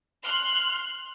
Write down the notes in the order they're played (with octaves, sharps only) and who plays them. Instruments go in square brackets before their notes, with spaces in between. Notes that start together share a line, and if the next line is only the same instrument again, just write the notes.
[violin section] C6 F6 F#6